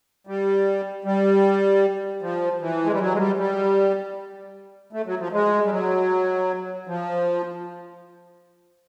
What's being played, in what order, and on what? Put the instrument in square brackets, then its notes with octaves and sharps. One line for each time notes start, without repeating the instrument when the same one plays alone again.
[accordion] G3
G3
F3
E3
G#3
G3
F#3
G#3
G3
G3
A3
F#3
F3
G#3
G3
F#3
F3